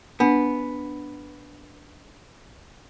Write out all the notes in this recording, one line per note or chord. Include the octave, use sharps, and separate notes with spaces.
B3 D4